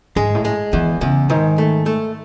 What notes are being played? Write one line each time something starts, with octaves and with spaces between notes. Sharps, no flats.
G#2 G#3
A2
G#3
E2 E3
E2 C#3
G#2 D#3
A3
A3